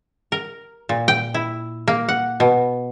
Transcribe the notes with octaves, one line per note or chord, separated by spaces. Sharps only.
A#4
A#2
G5
E4
A#3
F#5
B2